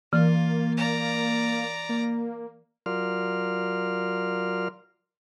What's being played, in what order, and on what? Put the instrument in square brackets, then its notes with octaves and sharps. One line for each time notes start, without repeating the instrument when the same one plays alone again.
[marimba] E3 [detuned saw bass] A#3 [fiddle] F4
[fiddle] D5 A#5
[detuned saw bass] A#3
[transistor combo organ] F#3 F4 A#4 D5 C6 F6